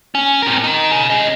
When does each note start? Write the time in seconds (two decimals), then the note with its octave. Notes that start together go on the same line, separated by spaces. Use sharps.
0.15 C#4
0.42 C4 A#4
0.64 D#4 A#4
0.91 C#3
1.10 C#4 D#5